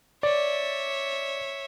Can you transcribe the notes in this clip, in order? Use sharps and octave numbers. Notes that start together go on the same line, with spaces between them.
C#5 D5 E5